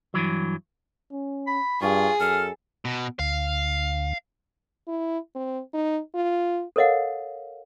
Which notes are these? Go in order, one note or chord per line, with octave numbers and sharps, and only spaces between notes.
G2 E3 F#3
C#4
B5
G2 F4 G#4 C#6
F#2 A4 F6
B2 A#5
D2 F5
E4
C4
D#4
F4
A4 A#4 C#5 D#5 F5 F#5